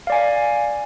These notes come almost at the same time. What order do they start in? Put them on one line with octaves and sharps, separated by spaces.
F5 D5 G#5